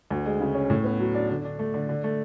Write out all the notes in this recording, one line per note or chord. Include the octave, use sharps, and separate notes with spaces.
D2
G#3
C#3
C#4
A2
B3
F#3
D4
D3
D4
A3
D3
D3
A3